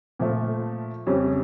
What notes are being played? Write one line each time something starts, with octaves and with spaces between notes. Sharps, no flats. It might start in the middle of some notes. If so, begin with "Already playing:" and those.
A#2 F3 A3
F2 C#3 G3 C#4